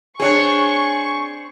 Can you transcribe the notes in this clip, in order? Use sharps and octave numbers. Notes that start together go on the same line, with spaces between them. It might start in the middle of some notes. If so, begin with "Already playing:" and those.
C4 D4 G#4 C#5 G#5 C#6